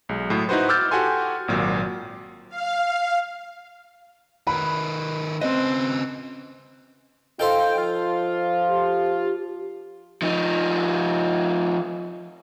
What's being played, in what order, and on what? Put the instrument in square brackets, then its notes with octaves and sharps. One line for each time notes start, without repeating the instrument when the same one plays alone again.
[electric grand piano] B1 G#3
A2 F#3
D#4 E4 F#4 B4 C5
D6 E6 F6 G6 A6
F#4 G4 A4 G#5 C6
G#1 A#2 F#3
[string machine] F5
[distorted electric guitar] D#3 B4 [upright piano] B5
[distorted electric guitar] C#3 B4 [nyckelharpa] C4 [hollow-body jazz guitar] D#5
[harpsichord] D#4 A4 C5 [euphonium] F4 [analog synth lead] G5
[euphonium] F3 [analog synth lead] F4
[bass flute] G4
[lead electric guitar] F3 D#4